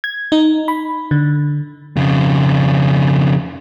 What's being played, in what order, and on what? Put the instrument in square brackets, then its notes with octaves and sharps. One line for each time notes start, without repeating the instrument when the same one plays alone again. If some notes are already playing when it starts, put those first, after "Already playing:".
[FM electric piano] G#6
D#4
B5
D3
[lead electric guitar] F2 C#3